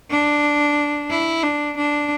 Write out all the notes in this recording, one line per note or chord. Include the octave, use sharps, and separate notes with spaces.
D4
E4
D4
D4